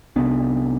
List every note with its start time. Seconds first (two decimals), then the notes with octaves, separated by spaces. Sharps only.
0.16 C2 C3 B3 D4